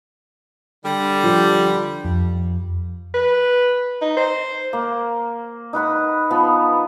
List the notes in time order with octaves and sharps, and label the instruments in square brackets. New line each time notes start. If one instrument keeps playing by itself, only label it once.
[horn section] D3 G3
[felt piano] F3 G4
[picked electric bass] F2
[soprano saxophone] B4
D#4
C5
[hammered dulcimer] A#3
D#4 B4 F#5 B5
F3 B3